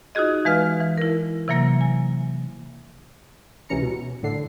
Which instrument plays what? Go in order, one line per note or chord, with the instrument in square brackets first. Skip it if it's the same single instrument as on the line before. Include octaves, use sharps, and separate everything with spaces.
[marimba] D#4 F4 F#4 G#4 D#5
E3 G#3 B4 F5 F6
E3
E4 A#4
C3 E3 F#3 A#3 A#6
G#5
[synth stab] C#2 C3 E3 C#4 A#5 C#7
B2
A2 D3 C7